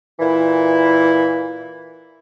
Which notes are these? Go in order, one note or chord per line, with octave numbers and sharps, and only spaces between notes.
A#2 E3 E4